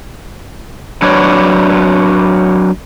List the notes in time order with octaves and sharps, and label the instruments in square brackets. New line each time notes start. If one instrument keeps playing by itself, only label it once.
[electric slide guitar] F#3 D4 B4 C#5 D5